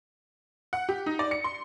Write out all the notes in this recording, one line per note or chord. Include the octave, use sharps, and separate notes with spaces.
F#5
G4
D#4
D5
C#7
C6